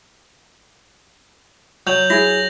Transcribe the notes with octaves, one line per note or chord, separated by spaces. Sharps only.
F#3 G6 F7 F#7
E4 G#4 A#6